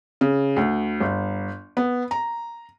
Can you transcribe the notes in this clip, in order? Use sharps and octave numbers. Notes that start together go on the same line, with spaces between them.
C#3
D2
G1
B3
A#5